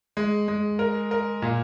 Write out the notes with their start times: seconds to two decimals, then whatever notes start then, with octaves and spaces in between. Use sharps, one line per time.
0.17 G#3
0.48 G#3
0.79 A#4
1.11 A#4
1.42 A#2